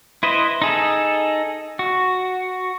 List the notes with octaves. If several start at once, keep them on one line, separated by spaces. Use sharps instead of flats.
E4 B4 C5 D#5
D#4 G#4 A4
F#4